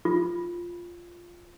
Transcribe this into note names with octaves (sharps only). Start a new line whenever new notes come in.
F4